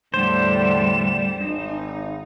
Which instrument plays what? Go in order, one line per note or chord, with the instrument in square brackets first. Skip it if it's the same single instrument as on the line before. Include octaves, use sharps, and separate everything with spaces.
[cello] E2 G3 [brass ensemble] A2 D3 [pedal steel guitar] C5 [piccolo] E7
[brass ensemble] G#1 [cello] D#4